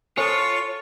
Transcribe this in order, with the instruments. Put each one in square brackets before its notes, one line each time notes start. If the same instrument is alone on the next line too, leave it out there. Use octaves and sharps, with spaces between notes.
[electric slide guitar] F4 [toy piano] A4 C5 G#5 [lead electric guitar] C#5 [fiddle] A5 C#6